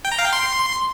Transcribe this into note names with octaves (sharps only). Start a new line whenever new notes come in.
G5
A#5
F5
G5
C6